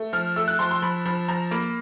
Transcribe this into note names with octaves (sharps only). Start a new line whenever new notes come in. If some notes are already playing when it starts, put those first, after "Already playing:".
Already playing: A3
F3 F6
A3 E6
F#6
F3 C6
C6
F3 B5
F3 B5
F3 A#5
A#3 B5